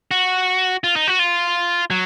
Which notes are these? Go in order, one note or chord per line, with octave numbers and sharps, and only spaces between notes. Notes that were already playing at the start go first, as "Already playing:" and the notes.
F#4
F4
D#4
F#4
F4
F#3